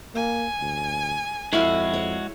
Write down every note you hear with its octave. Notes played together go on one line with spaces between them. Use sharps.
A#3 G#5
D2
F2 G#3 E4 F#4 A4 F5
C#5